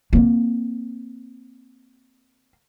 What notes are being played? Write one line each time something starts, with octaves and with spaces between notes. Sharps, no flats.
A#3 C4